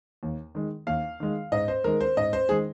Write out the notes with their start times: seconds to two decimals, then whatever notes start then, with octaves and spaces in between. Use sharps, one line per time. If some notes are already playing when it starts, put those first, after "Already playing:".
0.23 D#2
0.55 D#3 G#3
0.87 D#2 F5
1.20 D#3 G#3
1.52 G#2 D#5
1.68 C5
1.84 D#3 G#3 A#4
2.01 C5
2.17 G#2 D#5
2.33 C5
2.49 D#3 G#3 G#4